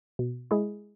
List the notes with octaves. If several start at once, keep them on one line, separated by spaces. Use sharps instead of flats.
B2
G#3 E4 G#4